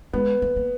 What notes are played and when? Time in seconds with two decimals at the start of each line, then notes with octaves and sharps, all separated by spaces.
0.13 G#3 B3
0.42 A3
0.56 A#3